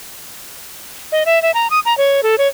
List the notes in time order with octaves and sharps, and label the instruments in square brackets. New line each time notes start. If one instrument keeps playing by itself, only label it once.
[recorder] D#5
E5
E5
A#5
D#6
A#5
C#5
A4
C#5